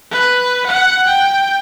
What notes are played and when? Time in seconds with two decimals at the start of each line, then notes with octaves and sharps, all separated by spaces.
0.11 B4
0.66 F#5
1.07 G5